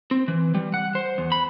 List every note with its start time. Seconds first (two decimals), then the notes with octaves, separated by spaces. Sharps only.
0.11 C4
0.28 E3
0.55 G3
0.74 F#5
0.95 C5
1.18 E2
1.32 B5